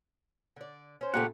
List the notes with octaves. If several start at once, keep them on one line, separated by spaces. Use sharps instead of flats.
D3 D5
C#4 C5
A#2 C#3 A3 G4 F#5